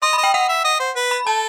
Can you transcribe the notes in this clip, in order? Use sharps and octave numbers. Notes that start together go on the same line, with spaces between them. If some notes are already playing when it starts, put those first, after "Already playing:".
D#5 C6
B5
D#5
G5
D#5 F#5
E5
D#5
C5
B4
B5
A4 A5